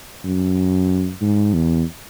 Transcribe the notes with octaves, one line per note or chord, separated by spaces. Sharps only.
F#2
G#2
E2